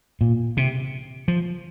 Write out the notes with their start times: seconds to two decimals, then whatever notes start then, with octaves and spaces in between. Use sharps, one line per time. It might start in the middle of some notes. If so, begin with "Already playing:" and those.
0.21 A#2
0.57 C3
1.28 F3